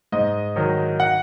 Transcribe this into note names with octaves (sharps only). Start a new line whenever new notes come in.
G#2 D#5
D#3 F#3
F#5